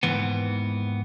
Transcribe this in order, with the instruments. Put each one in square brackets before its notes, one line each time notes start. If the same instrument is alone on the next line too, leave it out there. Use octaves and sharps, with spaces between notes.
[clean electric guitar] D#2 G#2 E3 B3